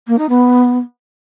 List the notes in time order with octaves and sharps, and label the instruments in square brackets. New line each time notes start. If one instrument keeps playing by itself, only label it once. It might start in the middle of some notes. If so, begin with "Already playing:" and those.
[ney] A#3
D#4
B3